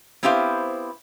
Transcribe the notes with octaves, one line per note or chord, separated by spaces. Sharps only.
B3 C4 E4 G4 C5 F5